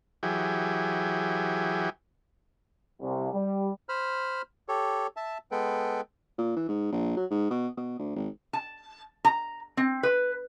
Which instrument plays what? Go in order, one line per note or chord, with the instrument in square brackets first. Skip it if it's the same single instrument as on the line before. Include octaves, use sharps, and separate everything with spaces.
[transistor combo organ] E3 F#3 G4 G#4
[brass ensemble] C2
G3
[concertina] C5 B5 F6
G4 A4 C#5
E5 A5
G#3 B3 A4 B4 G5
[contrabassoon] A#2
E3
G#2
A#1
F#3
G#2
B2
B2
D2
G#1
[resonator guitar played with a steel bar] A5
A#5
C4
B4